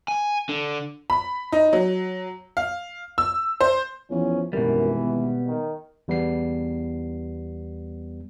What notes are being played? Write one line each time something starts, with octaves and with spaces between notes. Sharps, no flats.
G#5
D3
B5
D#4
F#3
F5
E6
C5
E2 F3 C#4
G#1 F#2 B2 E3 G3 A#4
B3
D#3
E2 G3 B3 C7